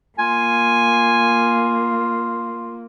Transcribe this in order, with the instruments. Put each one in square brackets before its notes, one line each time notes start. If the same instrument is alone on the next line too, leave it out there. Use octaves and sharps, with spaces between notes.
[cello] A#3 [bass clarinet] F4 [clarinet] G#5